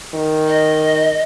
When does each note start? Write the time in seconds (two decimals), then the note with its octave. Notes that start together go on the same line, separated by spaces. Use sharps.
0.14 D#3
0.48 D#5